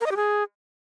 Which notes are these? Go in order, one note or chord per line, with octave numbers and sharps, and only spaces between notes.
A#4
D#5
G4
G#4